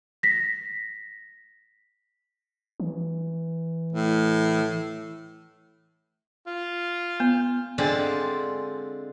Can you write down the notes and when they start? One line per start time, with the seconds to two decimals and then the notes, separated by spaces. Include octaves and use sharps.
0.23 A#6 B6
2.80 E3
3.92 A2
6.47 F4
7.20 B3
7.78 D3 G#3 C4 F4 D5